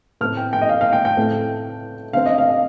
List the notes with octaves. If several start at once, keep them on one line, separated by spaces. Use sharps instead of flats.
A2 A3 C4 F6
G5
G5
D#5
F5
F5
G5
G5
A2 A3 C4
D3 A3 C4 F5
D#5
F5
D#5